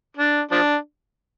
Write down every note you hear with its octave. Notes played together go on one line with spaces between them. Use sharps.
D4
F3 D4